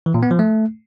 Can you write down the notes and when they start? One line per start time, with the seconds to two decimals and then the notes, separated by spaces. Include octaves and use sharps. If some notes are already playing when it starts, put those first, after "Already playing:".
0.06 E3
0.14 A#2
0.23 B3
0.31 F3
0.39 A3